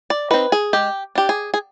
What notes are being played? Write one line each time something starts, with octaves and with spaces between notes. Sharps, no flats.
D5
C4 D#4 B4
G#4
G#3 G4
D4 G4
G#4
G#4